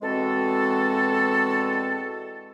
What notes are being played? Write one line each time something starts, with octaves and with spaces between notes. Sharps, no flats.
E2 G#3 C4 F#4 A4